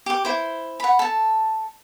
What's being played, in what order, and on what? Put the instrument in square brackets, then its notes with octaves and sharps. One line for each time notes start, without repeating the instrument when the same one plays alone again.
[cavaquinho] G4 D6
E4 C5
F#5 B5
A4 A5